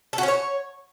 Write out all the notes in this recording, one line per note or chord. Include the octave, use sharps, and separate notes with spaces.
A4
F#4
C#4
C#5